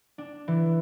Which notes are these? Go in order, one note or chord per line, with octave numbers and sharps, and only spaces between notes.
D4
E3